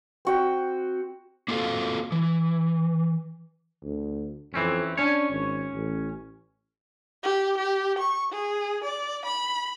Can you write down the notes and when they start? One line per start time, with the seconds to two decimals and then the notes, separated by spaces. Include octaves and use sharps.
0.25 C4 F#4 G5
1.48 A#3 C4 F4 F#4 A4 F5
2.12 E3
3.82 D2
4.54 F2 E3 C4 C#4
4.97 C#4 D4 C#5
5.30 G#1
5.73 A1
7.23 G4
7.58 G4
7.98 C#6
8.32 G#4
8.84 D5
9.25 B5